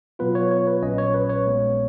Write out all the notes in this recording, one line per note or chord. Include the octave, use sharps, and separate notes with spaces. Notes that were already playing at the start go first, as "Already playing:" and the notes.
B2 F#3 B3 F4 B4
C#5
C#5
B4
A#1 A#2 F#3 C#4 D#5
C#5
B4
C#5
A#1 A#2 G#3 B3